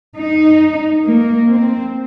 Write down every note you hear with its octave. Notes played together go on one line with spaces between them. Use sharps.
D#4
A#3
C4